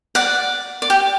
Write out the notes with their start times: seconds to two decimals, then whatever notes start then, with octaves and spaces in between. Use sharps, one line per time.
0.15 D5 F#5
0.82 D5
0.90 G4